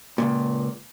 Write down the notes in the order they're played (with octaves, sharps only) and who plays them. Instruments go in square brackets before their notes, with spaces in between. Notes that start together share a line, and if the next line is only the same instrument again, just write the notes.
[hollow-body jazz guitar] C#2 F#2 A#2